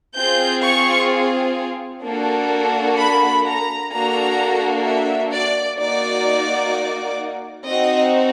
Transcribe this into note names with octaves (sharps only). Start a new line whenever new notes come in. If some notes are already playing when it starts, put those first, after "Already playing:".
C4 F4 G#4 G6
C#6
A#3 D4 F#4 A4
B5
A#5
A#3 D4 F#4 A4 A#5
E5
D5
A#3 D#4 F#4 D5
C4 D#4 F#4 D#5